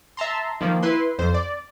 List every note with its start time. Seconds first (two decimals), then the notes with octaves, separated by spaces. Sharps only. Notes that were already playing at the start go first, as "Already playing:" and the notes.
0.17 E5 A5 A#5 C6
0.61 D#3 F3 A#3
0.83 E4 B4 C6
1.19 F2 C5
1.34 D5